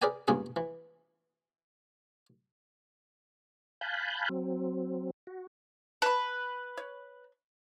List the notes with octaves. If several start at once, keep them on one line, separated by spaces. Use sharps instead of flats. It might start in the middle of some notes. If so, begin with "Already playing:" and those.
G#4 A#4 B4 D5 G5 G#5
C#2 G2 A#3 B3 G#4 B4
E3
F5 G#5 A5 B5 F#6 G6
F#3 C4
F#4
B4 A5 B5
C#5